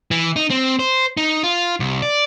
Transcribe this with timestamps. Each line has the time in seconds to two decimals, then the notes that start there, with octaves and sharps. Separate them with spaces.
0.11 E3
0.36 D#4
0.50 C4
0.79 C5
1.17 D#4
1.43 F4
1.80 C2
2.02 D5